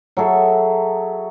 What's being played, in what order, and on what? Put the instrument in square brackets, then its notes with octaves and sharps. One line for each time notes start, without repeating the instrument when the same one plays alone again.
[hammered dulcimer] F#3 G#4 A4 E5